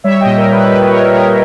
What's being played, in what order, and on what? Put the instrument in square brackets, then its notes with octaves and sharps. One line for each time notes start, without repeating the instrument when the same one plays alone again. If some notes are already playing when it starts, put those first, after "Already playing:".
[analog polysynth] G3 C#5 E5
D#5 G5
A#2
A#4
A#2 B4
G3 B4
A#2 A#4 C#5
A#2 A#4 C#5